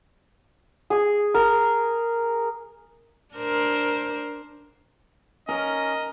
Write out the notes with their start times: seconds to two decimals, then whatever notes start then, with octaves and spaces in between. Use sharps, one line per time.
0.90 G#4
1.34 A#4
3.35 D4 A#4 C5
5.49 C#4 A#4 D#5